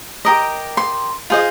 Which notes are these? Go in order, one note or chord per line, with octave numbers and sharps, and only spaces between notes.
G4 A#4 D#5
C6
F4 G#4 C5 D#5